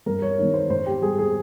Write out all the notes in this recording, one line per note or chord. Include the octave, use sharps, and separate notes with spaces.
G2 A#4
C#5
D#3 G#3 C#5
C5
G#2 C5
G4
G3 G#4
G#4